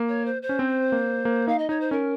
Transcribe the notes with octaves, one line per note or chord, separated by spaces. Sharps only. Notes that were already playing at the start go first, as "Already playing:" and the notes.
Already playing: A#3
C#5
C5
C5
C#4
C4
A#3
A#3
D#4 F5
D#5
D#4 C#5
C5
C#4 A#4